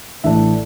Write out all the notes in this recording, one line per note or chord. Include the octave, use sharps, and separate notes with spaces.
A1 A2 A3 D4 E5